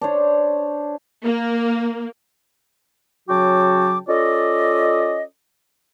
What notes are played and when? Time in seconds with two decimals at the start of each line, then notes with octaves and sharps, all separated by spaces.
0.01 D4 C5 C#5
1.24 A#3
3.29 C#3 F#3 F#4 G5 A5 D6
4.08 C#4 F4 A4 D5 D#5